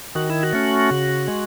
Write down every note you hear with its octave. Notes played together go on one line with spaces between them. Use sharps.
D#3 F#4
E4
F#4
A3 C#4
C#3
G#3